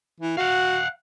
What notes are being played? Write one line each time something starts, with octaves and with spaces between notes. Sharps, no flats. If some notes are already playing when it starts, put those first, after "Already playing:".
E3
F#4 F5 F#5